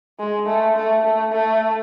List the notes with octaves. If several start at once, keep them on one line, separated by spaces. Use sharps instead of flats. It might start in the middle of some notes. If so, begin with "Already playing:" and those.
G#3
A3
A3
A3
A3